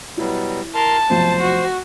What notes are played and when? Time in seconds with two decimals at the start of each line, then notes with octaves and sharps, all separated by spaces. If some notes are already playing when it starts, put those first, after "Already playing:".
0.17 B2 F#3 G3 E4
0.75 A#4 A5 C6 F6
1.10 F1 B1 F3 C5
1.40 F#4